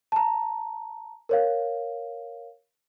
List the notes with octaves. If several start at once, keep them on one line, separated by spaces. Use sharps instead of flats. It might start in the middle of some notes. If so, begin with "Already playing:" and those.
A5 A#5
A#4 C#5 F5